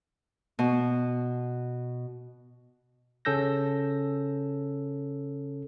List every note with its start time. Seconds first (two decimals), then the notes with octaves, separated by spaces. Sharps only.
0.59 B2
3.25 C#3 C#4 A4 E6 G6 A#6